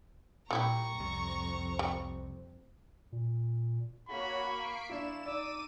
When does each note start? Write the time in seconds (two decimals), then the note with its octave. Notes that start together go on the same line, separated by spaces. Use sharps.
0.51 A#2 G3 E4 G4 A#5 C#6
1.00 C2 F2 C3
1.79 G3
3.12 A#2
4.09 A#3 F#4 C#5 B5 C#6
4.58 B6 C7 D7
4.90 D4 E4 F4 E7
5.26 D#4 D5 D6 E6 D#7